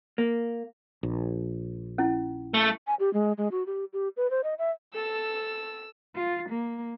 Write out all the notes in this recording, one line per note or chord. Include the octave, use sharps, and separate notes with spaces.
A#3
A#1
C#4 E4
A3
G#5
G4
G#3
G#3
F#4
G4
G4
B4
C5
D#5
E5
A4 A5 E6
F4
A#3